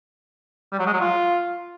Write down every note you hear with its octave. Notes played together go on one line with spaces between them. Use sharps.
G3
F#3
G#3
F#3
F4